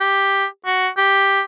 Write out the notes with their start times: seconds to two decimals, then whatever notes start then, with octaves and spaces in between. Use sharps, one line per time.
0.01 G4
0.66 F#4
0.98 G4